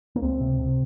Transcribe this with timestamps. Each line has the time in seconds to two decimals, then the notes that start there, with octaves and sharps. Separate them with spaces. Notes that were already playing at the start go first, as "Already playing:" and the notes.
0.16 A#3
0.22 C#2 C4
0.40 C3
0.59 C3